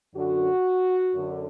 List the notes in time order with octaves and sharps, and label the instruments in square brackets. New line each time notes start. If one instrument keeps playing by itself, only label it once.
[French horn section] F#2 D3 F#4
F#2 D3